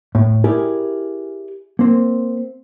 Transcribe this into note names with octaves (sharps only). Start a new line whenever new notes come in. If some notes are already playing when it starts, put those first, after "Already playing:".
A2
E4 G4 G#4 A#4 D5
A#3 C4